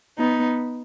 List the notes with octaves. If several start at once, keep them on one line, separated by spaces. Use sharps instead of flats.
B3 D#4